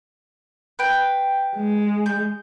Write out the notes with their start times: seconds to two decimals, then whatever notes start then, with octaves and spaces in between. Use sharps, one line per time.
0.79 B4 G5
1.56 G#3
2.06 G6